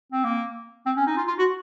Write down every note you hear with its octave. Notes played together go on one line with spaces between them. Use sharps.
C4
A#3
C4
C#4
D#4
F4
F4
F#4